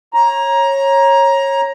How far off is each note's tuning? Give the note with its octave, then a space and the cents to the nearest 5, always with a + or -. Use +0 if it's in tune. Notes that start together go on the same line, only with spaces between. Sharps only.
C#5 -20 A#5 +15